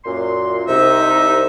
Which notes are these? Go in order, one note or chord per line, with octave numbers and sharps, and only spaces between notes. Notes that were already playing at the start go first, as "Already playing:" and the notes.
F#2 A#2 C6
C2 C3 D#4 E5